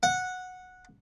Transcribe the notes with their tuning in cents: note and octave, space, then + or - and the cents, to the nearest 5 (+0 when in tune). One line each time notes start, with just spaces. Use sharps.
F#5 -10